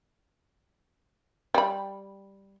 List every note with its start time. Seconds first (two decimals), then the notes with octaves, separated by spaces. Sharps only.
1.54 G3 B5